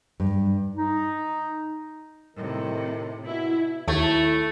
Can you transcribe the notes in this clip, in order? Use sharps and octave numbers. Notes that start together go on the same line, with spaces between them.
G2
D#4
A2 C3 D#3
B2 E4
D#2 A3 E4 C#5 G#6